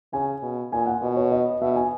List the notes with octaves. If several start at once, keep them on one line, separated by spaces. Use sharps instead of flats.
C#3 G#5
B2
A#2 G#5
F#5
B2 D#5
C#5
D#5
B2 E5
G#5